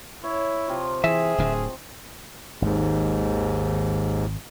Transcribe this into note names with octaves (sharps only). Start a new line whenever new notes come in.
E4 C#5
C3 F3 F4
E3 G#4 E5
D1 D2 D3
G#1 D#2 G#2